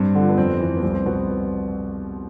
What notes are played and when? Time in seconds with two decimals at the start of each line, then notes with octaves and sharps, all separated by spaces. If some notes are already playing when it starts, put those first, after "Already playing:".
Already playing: G2 C4
0.15 D3 F3
0.29 B3
0.37 F2 C4
0.60 E3
0.76 B3
0.83 C2 C4
0.94 C4
1.06 B2 B3